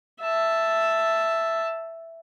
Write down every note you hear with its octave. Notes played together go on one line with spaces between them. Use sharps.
E5 A5